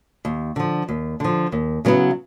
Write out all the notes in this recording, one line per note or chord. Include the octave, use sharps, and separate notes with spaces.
D#2
D3 F3
D#2
D3 F3
D#2
C#3 F#3 B3 E4